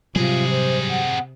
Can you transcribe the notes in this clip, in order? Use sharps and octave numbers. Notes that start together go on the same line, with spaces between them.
C3 F#3 G3 C4 F4 G#4
C5
F#5